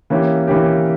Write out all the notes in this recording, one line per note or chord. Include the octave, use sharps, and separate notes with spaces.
E3 A#3 C#4 G4
E3 A#3 C#4 G4